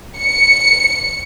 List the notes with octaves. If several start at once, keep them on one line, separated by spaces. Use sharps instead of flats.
C#7